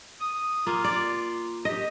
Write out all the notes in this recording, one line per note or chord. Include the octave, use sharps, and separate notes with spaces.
D#6
A#3 F4
D5
G4 D#5